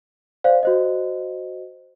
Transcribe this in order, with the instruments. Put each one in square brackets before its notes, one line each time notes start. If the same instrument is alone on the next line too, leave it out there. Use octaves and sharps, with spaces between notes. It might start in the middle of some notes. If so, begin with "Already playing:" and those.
[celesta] C5 D5 F5
F#4 C5 D#5